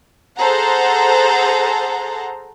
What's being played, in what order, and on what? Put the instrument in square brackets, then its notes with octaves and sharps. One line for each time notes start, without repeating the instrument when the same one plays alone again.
[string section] G#4 A4 C5 F#5 A#5